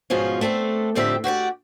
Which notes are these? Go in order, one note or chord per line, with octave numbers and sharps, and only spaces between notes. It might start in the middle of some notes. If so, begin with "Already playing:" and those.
G#2 B2 F3 C#4 F4
A3 C4 D4 A4
F2 A2 D3 C4 G4 E5
F#4 G4 C5 D5